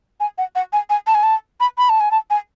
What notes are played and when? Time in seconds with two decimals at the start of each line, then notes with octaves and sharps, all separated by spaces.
0.20 G#5
0.38 F#5
0.55 F#5
0.73 G#5
0.90 G#5
1.07 A5
1.15 G#5
1.23 A5
1.60 B5
1.78 B5
1.89 A5
2.00 G#5
2.11 A5
2.30 G#5